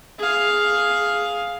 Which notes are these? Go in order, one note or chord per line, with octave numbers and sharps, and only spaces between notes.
G#4 F5